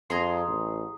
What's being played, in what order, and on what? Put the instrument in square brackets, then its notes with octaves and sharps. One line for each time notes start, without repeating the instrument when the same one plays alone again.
[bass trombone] F2 [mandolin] G#4 A#5 C6
[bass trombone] A1